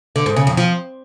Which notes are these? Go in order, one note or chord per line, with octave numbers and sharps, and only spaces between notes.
D3
G#2
C#3
F2
F3